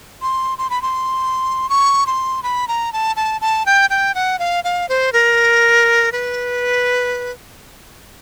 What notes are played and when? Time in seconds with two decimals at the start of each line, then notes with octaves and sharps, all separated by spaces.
0.22 C6
0.58 C6
0.70 B5
0.82 C6
1.69 C#6
2.07 C6
2.43 B5
2.68 A#5
2.93 A5
3.16 A5
3.41 A5
3.66 G5
3.90 G5
4.15 F#5
4.39 F5
4.64 F5
4.89 C5
5.13 A#4
6.12 B4